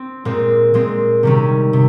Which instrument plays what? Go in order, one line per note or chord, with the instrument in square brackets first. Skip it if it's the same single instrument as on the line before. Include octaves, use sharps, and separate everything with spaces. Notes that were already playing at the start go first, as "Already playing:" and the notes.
Already playing: [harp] C4
A#2 G#3 C4
A#2 G#3 C4
C3 D#3 G3 C#4
C3